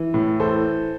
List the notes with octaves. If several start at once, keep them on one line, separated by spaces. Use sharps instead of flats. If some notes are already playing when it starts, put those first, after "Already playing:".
Already playing: E3
A2
E3 A4 C5